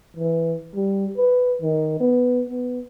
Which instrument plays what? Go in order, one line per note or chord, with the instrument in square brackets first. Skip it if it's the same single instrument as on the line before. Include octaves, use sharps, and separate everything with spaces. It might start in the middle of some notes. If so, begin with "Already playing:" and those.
[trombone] E3
G3
B4
D#3
B3
B3